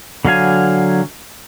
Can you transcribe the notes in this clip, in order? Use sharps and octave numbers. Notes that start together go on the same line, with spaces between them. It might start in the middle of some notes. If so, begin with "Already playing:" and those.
D3 F#3 F5 G#5